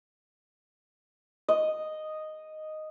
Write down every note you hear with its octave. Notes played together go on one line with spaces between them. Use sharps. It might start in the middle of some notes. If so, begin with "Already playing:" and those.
D#5